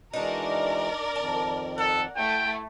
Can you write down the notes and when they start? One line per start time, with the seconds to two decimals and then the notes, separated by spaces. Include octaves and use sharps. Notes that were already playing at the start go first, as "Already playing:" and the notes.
0.13 E3 G#3 D4 D#4 F#4 A#4 D5
1.16 F2 D#3 A5
1.78 A4 F#5
2.17 A3 E4 G5